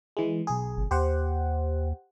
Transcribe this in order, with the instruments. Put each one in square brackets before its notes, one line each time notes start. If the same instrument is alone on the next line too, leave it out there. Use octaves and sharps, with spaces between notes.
[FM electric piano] E3 G#3
B1 G#4
[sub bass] G1
[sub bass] D#2 [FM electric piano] G4 C5 F#5